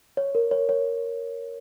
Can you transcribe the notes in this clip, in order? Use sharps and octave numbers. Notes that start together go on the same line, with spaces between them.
C#5
A#4
C#5
C#5